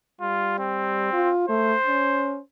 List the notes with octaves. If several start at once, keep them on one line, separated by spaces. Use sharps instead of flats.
G3 F4
C4
F4
A3 C5
C#4